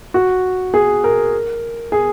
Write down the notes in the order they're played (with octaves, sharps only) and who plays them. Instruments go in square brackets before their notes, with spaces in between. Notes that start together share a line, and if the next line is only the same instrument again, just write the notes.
[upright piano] F#4
G#4
A#4
G#4